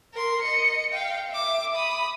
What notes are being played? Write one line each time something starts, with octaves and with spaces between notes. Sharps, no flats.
A#4 C6
D#5 C#7
F5 G5
E5 D6
B5 D#6